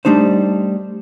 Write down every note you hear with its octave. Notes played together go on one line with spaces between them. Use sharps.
G3 A3 D4 D#4 C5